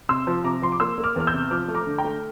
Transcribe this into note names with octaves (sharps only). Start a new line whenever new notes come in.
C3 C6 E6
F3
C3 A#5 D6
F3 C6
D6
A#3 C6 E6
A#3
D6 F6
E2 F6
E6 G6
C3
F3 D6 F6
A3
A#5 D6
D3
G5 A#5
A3